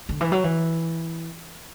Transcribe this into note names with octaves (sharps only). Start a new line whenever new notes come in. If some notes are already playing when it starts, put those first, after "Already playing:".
D3
E3
F#3
E3